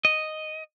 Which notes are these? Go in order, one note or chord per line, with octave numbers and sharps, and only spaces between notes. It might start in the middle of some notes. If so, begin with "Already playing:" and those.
D#5